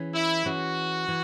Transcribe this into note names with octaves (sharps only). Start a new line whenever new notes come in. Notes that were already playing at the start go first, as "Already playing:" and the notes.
Already playing: E3 C#4 G#4
E4
E3 C#4 F#4 G#4
E3